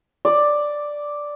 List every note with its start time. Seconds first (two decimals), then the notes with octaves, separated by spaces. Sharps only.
0.25 D5